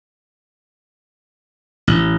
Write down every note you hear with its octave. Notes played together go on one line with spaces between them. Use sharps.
A1